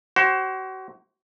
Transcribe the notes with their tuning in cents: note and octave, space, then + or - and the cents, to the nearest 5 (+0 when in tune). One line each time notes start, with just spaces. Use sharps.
F#4 +35 C5 +25